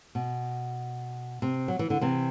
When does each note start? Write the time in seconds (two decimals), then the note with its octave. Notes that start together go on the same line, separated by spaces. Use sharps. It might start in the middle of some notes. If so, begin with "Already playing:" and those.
0.15 B2
1.42 C3
1.68 F#3
1.79 E3
1.90 D3
2.01 C3 E3